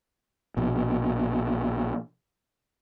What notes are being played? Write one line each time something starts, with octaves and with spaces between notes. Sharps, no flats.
A#1 B2